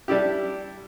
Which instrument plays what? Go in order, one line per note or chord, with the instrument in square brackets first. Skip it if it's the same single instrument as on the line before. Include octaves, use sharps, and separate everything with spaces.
[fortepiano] G3 D4 E4 G4